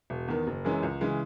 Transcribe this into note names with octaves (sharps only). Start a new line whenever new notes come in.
E1
E2 D#3
F#1
F#2 E3 G#3 C#4
C#2
C#3 E3 G#3